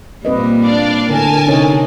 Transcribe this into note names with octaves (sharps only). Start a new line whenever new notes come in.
A#2 G3 A#3 C4 B4 D#5
D4 D5 F5
A2 D3 A#4 G#5 A5
C3 C4 C#4 D#4 C#5